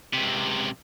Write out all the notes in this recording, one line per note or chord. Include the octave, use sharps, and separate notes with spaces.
C#2 C3